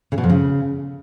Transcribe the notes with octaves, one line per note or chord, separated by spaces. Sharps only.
C#3
B2
F2
C#3